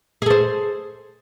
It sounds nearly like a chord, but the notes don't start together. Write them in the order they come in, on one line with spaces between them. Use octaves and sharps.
G#4 A4 C5